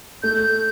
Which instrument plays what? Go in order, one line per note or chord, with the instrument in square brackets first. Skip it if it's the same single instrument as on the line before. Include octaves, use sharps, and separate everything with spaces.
[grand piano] A3 [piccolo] G6
[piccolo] G6